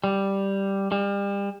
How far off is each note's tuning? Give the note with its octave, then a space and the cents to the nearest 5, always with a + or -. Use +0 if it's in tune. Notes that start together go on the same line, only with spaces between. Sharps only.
G3 +0
G3 +35